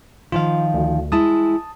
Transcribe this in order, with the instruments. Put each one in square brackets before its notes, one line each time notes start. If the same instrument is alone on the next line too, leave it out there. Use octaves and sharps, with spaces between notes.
[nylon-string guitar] D#3 F3 F5 [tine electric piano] F4
[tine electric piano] D2
[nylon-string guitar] G#3 E4 [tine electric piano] A5 D#6